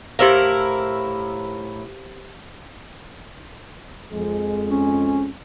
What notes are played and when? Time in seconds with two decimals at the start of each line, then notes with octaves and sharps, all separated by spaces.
0.19 A2 E4 G4 A#4 C5 F5
4.11 F2 G#3
4.70 C#4